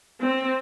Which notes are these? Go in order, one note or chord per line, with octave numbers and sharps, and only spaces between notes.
C4